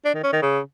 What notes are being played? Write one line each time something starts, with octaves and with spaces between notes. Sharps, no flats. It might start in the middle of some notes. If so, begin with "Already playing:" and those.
D4
D#3
C#4
D#3
C#3